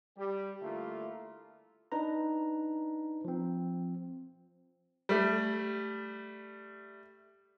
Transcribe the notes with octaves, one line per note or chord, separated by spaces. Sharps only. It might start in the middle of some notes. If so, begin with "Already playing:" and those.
G3 G4
D3 A3 A#3 E4 F4
D4 D#4 B4 A#5
F3 C4
G3 A3